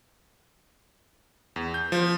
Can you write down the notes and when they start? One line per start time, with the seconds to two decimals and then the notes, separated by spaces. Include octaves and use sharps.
1.56 E2
1.74 G6
1.92 F3